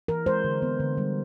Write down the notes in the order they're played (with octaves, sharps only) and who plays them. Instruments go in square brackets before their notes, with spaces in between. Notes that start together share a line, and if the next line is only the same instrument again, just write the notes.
[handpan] E3 A#4
G#3 C5
D3
B3
D3
G3